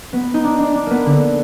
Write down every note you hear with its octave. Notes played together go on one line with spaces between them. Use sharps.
B3
D#4
D4
D4
D4
A#3 B3
D3